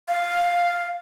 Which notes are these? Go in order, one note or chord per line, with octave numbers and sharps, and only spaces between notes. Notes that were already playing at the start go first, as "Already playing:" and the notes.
F5